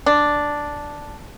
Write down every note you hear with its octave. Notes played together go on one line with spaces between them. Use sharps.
D4